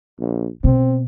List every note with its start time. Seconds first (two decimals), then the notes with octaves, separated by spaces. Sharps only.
0.20 A#1
0.64 B2 C4